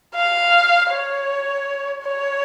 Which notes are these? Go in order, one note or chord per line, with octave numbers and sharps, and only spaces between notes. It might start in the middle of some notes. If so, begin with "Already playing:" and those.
F5
C#5
C#5